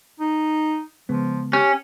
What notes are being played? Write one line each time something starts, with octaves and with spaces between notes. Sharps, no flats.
D#4
C#3 F3 G#3 B3
C#4 G4